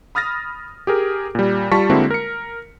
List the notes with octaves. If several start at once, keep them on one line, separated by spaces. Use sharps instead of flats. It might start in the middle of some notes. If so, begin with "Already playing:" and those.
B5 D#6 F6 A6 A#6
G4 G#4 A#4
A#2 G3
G3 F4 A5 C#6 B6
D3 G#3 A#3 C4 E4 F#4
A#4 C#7